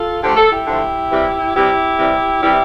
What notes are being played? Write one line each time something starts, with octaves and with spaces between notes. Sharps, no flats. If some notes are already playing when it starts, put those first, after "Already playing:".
Already playing: F4 A4
D3 F3 A3 G4
A4
E4 G4
D3 F3 A3
C3 E3 G3
C3 E3 G3 E4 G4
C3 E3 G3
C3 E3 G3 E4 G4